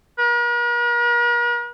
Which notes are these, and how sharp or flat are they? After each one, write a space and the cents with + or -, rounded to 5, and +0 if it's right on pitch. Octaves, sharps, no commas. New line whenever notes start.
A#4 +45